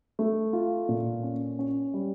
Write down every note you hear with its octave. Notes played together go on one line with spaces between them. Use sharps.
A3
F4
A#2
C#4
C#4
G3